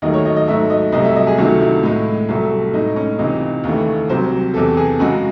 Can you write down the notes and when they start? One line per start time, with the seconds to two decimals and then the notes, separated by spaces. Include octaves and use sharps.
0.02 D#2 D#3 F#3 A3 D#5
0.14 C#5
0.25 D#5
0.36 D#5
0.47 G#2 F#3 A3 E5
0.70 D#5
0.92 C2 C3 F#3 A3 D#5
1.04 E5
1.16 D#5
1.27 G#4
1.38 C#2 C3 D#3 F#3 A3 F#4
1.61 E4
1.83 A2 G#3
2.29 C2 C3 F#3 A3
2.74 A2 G#3 D#4
2.96 C#4
3.19 C#2 C3 E3 D#4
3.64 D#2 C#3 E3 A3
4.09 C2 C3 F#3 C5
4.54 E2 C3 E3 A4
4.77 G#4
4.99 F#2 C#3 G#3 F#4